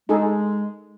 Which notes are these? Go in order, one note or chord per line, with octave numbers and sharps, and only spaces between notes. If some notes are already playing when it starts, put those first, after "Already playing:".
G#3 D#4 G#4 A4